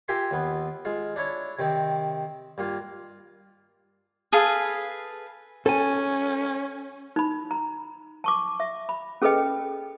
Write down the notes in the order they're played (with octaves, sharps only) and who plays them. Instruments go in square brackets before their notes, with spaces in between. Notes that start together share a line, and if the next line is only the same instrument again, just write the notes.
[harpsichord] F4 G4 A#4 E5 G#5 C6
D#2 B3
G#3 F4
D4 E4 C#5
C3 D#3 C4
G2 A#3 F4
[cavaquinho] G#4 A4 B4 F5
[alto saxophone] C#4 [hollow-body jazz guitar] A4 G#5
[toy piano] D#4 B5
A#5
A5 C#6 D6
E5
B5
C#4 G#4 A4 B4 D#5 G5